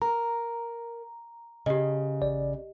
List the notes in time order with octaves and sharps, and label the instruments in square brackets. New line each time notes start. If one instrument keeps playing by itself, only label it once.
[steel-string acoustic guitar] A#4 [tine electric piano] A#5
[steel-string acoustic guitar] C#3 [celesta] G4 D#5
[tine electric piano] A1 D5